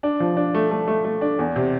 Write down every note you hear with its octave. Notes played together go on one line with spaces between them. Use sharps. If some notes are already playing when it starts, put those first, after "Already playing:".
D4
F3
D4
A3
A3
A3
A3
D4
E2
C3